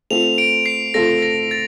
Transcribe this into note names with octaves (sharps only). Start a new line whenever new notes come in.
A3 C4 F4 A4 F7
D7
C7
A3 C4 F4 A4 A#6
A#6
A6